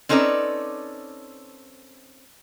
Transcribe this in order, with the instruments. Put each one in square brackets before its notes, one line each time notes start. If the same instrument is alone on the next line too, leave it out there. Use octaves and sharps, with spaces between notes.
[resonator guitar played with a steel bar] C4 C#4 D#4 A4 B4 D5